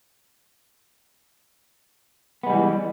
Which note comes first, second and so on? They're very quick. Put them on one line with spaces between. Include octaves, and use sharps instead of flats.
B3 G#3 G3 E3